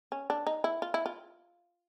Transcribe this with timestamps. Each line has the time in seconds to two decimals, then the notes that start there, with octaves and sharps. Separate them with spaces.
0.12 C#4
0.30 D4
0.47 D#4
0.64 E4
0.82 F4
0.94 E4
1.06 F4